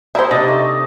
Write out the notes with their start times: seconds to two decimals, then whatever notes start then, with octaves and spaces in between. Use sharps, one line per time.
0.15 D#4 E4 C5 C#5 E5
0.31 C3 D4 D#4 D#5 A5
0.48 A3